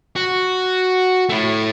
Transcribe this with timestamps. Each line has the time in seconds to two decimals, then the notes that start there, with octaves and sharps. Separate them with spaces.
0.16 F#4
1.29 A3 E4